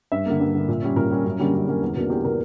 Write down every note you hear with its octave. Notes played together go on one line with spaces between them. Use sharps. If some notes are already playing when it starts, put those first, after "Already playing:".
G2 E5
D3 A#3
G2
D3 A#3
A#2
G3 C#4
A#2 A#4
G3 C#4
F#2
D3 G3 A#3 C#4
F#2
D3 G3 A#3 C#4
E2
B2 A#3 D4
E2 G4
B2 A#3 D4 A#4